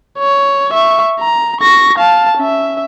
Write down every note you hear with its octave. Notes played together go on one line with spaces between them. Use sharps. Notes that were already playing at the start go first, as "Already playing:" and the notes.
C#5
E5 C#6
A#5
C#6 A#6
F5 A5
C#4 E5